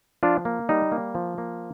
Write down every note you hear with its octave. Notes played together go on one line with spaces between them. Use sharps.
F3 D4 F4
A#3
G3 D#4
A#3
F3
A#3